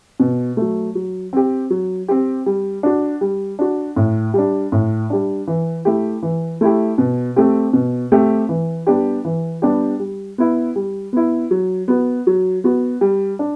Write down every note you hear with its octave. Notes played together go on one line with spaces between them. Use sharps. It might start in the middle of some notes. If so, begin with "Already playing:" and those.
B2
F#3 A3
F#3
C4 G4
F#3
C4 G4
G3
D4 F#4
G3
D4 F#4
A2
G3 D4
A2
G3 D4
E3
A3 E4 G4
E3
A3 E4 G4
B2
A3 C4 G4
B2
A3 C4 G4
E3
G3 B3 D4 G4
E3
G3 B3 D4 G4
G3
B3 E4
G3
B3 E4
F#3
B3 F#4
F#3
B3 F#4
G3
D4